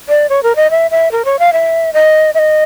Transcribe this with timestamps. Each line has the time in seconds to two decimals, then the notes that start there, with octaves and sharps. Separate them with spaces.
0.09 D5
0.29 C#5
0.43 A#4
0.56 D#5
0.71 E5
0.91 E5
1.12 A#4
1.25 C#5
1.39 F5
1.53 E5
1.93 D#5
2.34 E5
2.38 D#5